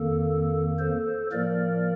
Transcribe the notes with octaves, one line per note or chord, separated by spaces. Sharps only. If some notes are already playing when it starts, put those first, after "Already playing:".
Already playing: F2 D#3 A#3 A4
A4 C5
A2 F3 A#3 A#4 D5